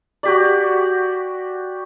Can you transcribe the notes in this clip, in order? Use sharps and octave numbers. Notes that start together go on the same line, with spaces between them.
F#4 G4 D5